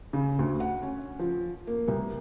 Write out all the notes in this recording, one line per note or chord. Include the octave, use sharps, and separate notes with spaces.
C#3
D2
F#5
C#4
F3
A#3
C2